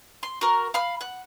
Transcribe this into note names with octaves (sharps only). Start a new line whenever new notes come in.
C6
F#4 A#4
F5 B5 F6
F#5